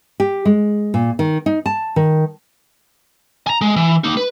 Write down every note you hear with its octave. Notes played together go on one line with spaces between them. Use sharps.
G4
G#3
A#2
D#3
D#4
A5
D#3
G#5 A#5
G#3
E3
A#3 D#4
B4